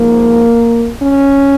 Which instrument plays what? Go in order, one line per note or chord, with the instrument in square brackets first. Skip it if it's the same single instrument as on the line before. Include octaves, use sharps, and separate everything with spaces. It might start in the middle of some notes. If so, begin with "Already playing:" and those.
Already playing: [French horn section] G#2 F3 A#3
C#4